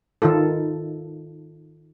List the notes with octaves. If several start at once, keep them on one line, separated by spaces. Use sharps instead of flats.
D#3 D#4 F4 A4